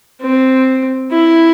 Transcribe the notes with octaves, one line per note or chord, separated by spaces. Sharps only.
C4
E4